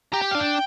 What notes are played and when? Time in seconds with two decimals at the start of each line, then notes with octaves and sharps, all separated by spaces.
0.13 G4 A#5
0.22 G5
0.31 D4 F5
0.41 G5